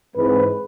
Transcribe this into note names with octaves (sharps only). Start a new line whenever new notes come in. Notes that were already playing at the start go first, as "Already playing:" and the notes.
G#2 E3 G#3 C4 B4